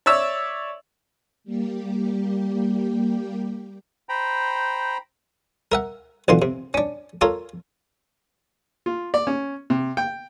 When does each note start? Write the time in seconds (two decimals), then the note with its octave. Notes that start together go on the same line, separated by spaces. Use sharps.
0.06 C#5 D5 E5 E6
1.44 G3 A#3 G4
4.09 C5 G5 A#5 B5
5.72 A#4 E5 F#5
6.28 B1 D3 E3 F4 C6
6.42 C3
6.74 C#4 D4
7.21 F4 A4 A#4 C#5
8.86 F4
9.14 D5
9.27 C#4
9.70 C3
9.97 G5